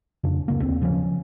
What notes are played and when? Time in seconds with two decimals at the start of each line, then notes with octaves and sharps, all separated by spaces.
0.24 F2 C#3 D4
0.48 D1 C#3 A#3
0.62 D#2 C4
0.82 C#3 F3 F#3 C#4